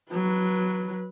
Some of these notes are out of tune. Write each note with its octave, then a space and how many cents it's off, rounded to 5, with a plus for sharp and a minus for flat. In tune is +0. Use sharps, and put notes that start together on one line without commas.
F#3 +0 B4 -20